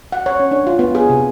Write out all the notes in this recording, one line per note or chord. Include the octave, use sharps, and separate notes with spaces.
F#5
C#5
C#4
D4
F4
B3
G#4
C3